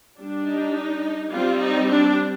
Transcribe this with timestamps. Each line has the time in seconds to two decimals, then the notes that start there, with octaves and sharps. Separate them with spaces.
0.19 G3 D4
0.47 D#4
1.32 G3 C4 F4
1.61 D#4
1.89 D4